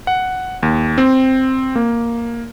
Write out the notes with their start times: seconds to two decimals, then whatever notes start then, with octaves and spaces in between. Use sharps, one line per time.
0.07 F#5
0.63 D#2
0.98 C4
1.76 A#3